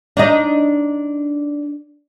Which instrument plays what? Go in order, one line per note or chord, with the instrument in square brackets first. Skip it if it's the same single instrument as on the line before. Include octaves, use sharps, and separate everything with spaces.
[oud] D4 D#4 D#5